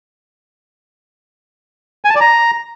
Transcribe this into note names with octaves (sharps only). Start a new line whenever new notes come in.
G#5
A5
D5
A#5